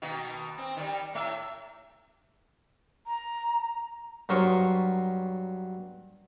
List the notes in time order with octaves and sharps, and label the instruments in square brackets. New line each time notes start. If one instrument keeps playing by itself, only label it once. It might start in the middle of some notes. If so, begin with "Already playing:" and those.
[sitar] B2 D#3 A#3
C4
D#3 G3
A2 A3 E5
[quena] A#5
[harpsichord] G2 F#3 A#4 C5 C#6 D#6